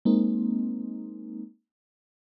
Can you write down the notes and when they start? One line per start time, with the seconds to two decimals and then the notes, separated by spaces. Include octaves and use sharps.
0.05 G#3 A#3 C4 D#4